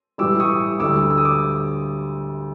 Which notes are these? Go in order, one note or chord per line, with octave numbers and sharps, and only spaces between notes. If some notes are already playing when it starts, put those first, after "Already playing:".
A2 E3 G3 D6 E6
C#6 D#6
D2 D3 G3 D6 E6
E6
D#6
D6